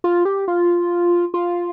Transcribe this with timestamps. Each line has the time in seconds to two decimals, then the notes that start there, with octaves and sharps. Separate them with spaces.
0.04 F4
0.25 G4
0.48 F4
1.34 F4